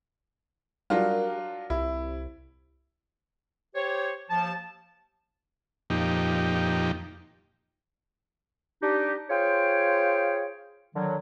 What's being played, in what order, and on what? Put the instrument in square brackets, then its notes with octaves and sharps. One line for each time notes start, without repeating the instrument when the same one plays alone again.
[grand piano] F#3 D4 F4 [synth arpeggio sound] G3 A#4
[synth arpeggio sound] C2 [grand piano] E4
[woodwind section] G4 C5 C#5
D#2 F3 A5
[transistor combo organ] F2 A#2 D#4 G4
[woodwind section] D4 D#4 G4
F4 G#4 C5 C#5 G5
D3 D#3 F#3